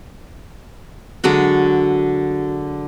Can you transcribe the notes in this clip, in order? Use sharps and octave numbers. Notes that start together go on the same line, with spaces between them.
D3 F#3 G#3 F#4